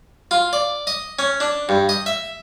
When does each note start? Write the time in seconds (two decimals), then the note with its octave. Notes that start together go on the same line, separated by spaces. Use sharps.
0.31 F4
0.53 D5
0.87 D#5
1.19 C#4
1.40 D4
1.69 G2
1.89 D#5
2.06 E5